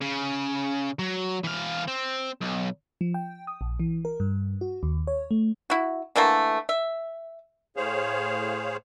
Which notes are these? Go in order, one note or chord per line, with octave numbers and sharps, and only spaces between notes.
C#3
F#3
E3 F5
C4
B1
F3
G5
D#6
A#1
E3
A#4
G2
F#4
D#2
C#5
A3
E4 F#4
D3 E3 A3 A#3
E5
A2 G#4 C5 C#5 F5